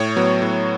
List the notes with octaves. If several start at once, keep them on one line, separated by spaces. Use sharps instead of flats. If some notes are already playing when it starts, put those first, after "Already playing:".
Already playing: A2 C#5
F#3 B3
A2